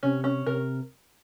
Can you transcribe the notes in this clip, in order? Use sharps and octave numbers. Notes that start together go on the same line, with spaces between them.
C3 C#4
C#4
C3 A#4